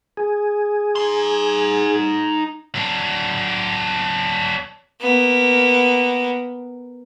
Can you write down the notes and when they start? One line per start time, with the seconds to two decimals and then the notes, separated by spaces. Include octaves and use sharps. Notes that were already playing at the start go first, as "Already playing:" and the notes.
0.17 G#4
0.96 D#4 C6
2.75 F#3 D4
5.01 A#3 B3